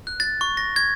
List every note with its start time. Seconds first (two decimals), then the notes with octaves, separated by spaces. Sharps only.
0.07 F#6
0.20 A6
0.41 C#6
0.57 A#6
0.76 G#6